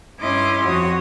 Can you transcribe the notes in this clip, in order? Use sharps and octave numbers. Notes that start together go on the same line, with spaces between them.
G2 C#4 E4 D#5 C6 D6
F2 F#4 C#5 D#6